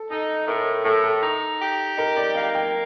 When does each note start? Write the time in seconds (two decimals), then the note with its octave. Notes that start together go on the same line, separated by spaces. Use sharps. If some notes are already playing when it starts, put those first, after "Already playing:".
Already playing: A4
0.11 D#4 A4
0.47 A2 A#4
0.85 A2 A4
1.04 A4
1.23 D#4
1.61 G4
1.98 D#4 A#4
2.17 D5
2.35 A#3 F5
2.55 G5